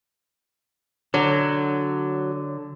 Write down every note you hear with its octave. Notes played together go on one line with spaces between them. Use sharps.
D3 F#3